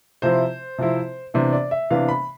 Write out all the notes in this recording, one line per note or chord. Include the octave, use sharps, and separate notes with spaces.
C3 F3 C4 E4 C5
C3 F3 C4 E4
C3 E3 B3 D4 C5
D5
E5
C3 E3 B3 D4 F5
B5